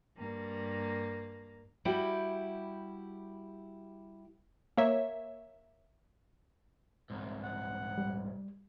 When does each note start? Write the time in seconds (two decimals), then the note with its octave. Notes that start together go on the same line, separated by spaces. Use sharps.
0.17 G2 A#3
1.85 G3 E4 F#4 G4
4.77 A#3 C#5 E5
7.10 C2 G#2
7.44 F#5
7.98 G3